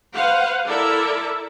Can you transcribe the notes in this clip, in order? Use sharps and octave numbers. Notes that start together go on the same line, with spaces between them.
B4 C5 F5 F#5
E4 A4 A#4 D5 E5